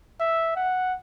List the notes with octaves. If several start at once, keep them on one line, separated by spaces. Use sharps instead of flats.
E5
F#5